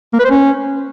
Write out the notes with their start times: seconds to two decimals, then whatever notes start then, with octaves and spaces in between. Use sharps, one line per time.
0.14 A#3
0.19 B4
0.25 C5
0.31 C#4